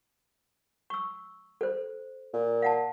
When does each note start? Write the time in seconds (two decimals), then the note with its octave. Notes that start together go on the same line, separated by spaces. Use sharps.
0.90 C#6 E6
1.61 A4 C5
2.34 A#2
2.62 F5 F#5 A5